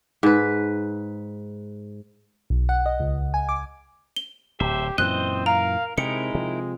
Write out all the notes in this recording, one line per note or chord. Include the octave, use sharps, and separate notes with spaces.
G#2 B4
B1
F#5
D#5
C#2
G#5
D6
G7
D1 G4 C5 E5
F#2 A#2 E3 C4 C5 D#5 F#6
A#4 F5 A#5
C3 G#3 D#4 E4 A#4 C#7
C3 F3